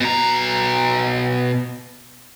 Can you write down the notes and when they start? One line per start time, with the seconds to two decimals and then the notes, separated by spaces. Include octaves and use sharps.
0.01 B2 A#5